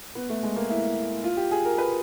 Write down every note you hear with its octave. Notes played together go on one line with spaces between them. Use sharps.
B3
A3
G#3
A#3
E4
F4
G4
G#4
A#4
B4